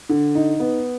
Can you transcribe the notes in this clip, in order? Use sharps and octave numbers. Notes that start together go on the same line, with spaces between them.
D3
D#4
B3